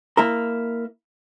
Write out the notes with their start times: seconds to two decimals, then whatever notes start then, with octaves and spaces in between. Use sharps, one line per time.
0.17 A#3 E4 A#4